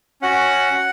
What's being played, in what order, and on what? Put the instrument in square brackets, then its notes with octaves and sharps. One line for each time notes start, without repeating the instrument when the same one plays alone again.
[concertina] C#4 F#4 F#5